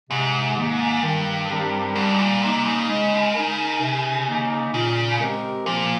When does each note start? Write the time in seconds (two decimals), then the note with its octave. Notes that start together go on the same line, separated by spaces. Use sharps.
0.10 G#2 C3
0.56 D#3 A#3
1.03 G2 D#3
1.49 G3 C4 G4 A#4
1.95 G#2 G3
2.02 G2
2.10 G#2
2.19 A#2
2.42 C3 A#3 D#4
2.66 C#3
2.88 G#3
3.35 D#4 A#4
3.81 C3
4.28 D#3 A#3 D#4
4.74 A#2 C#3
5.20 G#3 C4 G4 A#4
5.66 A#2 F3